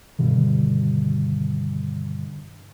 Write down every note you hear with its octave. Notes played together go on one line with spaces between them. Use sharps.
G2 B2 D3 D#3